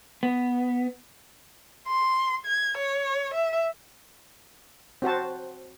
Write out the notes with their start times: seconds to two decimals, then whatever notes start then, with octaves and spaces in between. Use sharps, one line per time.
0.23 B3
1.88 C6
2.46 G#6
2.78 C#5
3.34 E5
5.02 C4 F#4 C5 A5